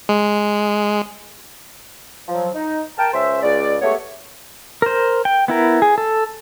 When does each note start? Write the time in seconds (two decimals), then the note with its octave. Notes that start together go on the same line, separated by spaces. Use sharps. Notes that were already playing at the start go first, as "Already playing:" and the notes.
0.09 G#3
2.28 F3 F#3
2.54 D#4
2.98 A#4 G5 A5
3.13 C#2 C#4 C5 E5
3.43 C#2 D5
3.82 G#3 A3 B3 G4 C#5
4.82 A#4 C5
5.25 G5
5.48 B3 E4 A#4
5.82 G#4
5.98 A4